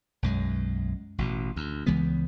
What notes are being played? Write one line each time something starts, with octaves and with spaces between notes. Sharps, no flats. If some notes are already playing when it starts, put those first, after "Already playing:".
B1 F#2 G#3
A1 B2
D2
C#2 E3 G#3 B3